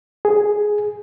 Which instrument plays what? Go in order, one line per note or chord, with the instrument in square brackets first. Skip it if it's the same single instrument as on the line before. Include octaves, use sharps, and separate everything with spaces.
[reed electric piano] G#4